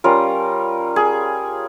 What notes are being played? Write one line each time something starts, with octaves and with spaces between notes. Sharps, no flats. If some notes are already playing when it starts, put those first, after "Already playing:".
G3 C#4 F4 A#4
G#4